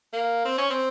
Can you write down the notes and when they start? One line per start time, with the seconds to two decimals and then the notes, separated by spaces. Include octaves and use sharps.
0.13 A#3
0.45 C4
0.58 C#4
0.70 C4